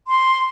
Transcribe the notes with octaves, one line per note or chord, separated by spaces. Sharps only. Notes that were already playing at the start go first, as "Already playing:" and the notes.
C6